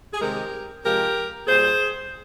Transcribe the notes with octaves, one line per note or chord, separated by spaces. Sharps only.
G#4
C3 D#3 G#3 G4 A#4
C3 F3 G#3 G4 A#4
A#2 G3 G#4 C5